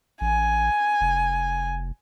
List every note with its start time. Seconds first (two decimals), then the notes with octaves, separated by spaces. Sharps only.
0.21 A1 G#5
1.01 F1